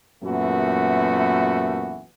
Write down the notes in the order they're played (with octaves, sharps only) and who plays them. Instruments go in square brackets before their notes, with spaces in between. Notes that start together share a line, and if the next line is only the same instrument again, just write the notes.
[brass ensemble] F#2 A#2 E3 A3 B3 F#4